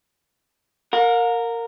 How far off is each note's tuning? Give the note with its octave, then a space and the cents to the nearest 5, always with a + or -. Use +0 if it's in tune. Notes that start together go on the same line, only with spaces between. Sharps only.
A#4 -10 F5 +45